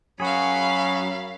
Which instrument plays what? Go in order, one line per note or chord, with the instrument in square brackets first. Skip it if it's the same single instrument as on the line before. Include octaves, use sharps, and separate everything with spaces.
[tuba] F#2 [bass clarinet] F#3 [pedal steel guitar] F#4 G#4 [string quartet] F5 B5